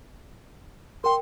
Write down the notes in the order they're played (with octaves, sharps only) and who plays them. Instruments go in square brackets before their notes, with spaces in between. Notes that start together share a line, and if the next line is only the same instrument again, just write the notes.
[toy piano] A#4 G5 [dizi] C6